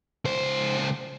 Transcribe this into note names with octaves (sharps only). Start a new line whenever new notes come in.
C#2 C5